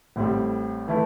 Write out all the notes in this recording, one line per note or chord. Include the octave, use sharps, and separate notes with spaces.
A1 A2 G3 C4
E3 A3 E4